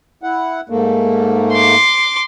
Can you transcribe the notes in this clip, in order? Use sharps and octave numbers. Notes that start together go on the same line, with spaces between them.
E4 F#5
G#2 A3 A#3
C6 D6